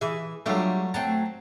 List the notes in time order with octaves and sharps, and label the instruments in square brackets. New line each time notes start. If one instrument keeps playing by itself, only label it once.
[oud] E3 G#4 [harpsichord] E5
[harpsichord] F#3 A3 [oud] G3 D4 F4
[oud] F#3 A3 C4 [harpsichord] A5 A#5